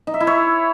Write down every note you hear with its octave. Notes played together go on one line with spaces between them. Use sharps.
D#4
E5
E4
C#5